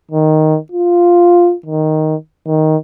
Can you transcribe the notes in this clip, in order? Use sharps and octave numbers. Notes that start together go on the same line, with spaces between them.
D#3
F4
D#3
D#3